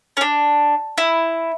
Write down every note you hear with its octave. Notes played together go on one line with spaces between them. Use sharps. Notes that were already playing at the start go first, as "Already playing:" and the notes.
C#4
D4
E4